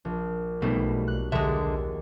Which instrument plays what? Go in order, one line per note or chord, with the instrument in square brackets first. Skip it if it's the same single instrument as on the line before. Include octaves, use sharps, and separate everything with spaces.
[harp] A#1
[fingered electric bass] B1 B3 [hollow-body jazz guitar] B2 A3 [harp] F#3 G3 D#4
[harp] F#6
[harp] D#2 F#3 G#4 [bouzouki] D3 G#3 [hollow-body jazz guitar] E5